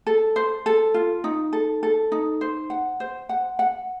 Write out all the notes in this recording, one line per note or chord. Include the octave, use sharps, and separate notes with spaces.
A4
C5
A4
F4
D#4
A4
A4
D#4
C5
F#5
C5
F#5
F#5